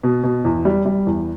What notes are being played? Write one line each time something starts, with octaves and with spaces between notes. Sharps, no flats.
B2
B2
E2
G3
G3
E2